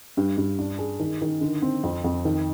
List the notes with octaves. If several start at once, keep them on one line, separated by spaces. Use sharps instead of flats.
G2
G2
D4
G#4
D#3
D#3
D3
C4
F2
F2
D#3